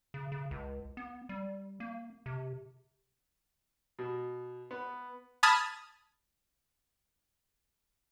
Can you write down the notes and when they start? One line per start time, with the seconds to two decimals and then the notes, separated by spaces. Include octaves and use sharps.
0.14 C#3
0.32 C#3
0.51 C#2
0.97 B3
1.29 G3
1.80 A#3
2.26 C3
3.99 B2
4.71 B3
5.43 A5 B5 D#6 F6 G#6 A6